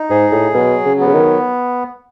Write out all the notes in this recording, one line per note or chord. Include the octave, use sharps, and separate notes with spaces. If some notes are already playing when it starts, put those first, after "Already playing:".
Already playing: D#4
G#2 G#4
A2
B2 F#3
C#3
B3
C#3
D#3